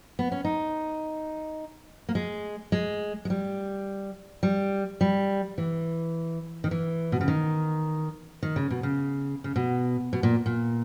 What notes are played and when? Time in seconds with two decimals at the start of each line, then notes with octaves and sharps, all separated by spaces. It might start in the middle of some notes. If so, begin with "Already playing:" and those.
0.19 B3
0.32 C#4
0.44 D#4
2.09 A#3
2.15 G#3
2.72 G#3
3.25 G#3
3.30 G3
4.43 G3
5.01 G3
5.58 E3
6.64 D#3
6.71 E3
7.12 B2
7.21 C#3
7.28 D#3
8.43 D#3
8.56 C#3
8.70 B2
8.83 C#3
9.44 C#3
9.56 B2
10.13 B2
10.23 A#2
10.46 A#2